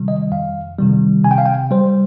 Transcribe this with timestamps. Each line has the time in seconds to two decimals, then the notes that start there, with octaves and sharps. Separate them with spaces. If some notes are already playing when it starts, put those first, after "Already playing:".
Already playing: C3 D#3 G3
0.08 D#5
0.31 F2 F5
0.78 C3 D#3 G3
1.24 C3 G#5
1.31 G5
1.38 F5
1.46 G5
1.71 G3 C5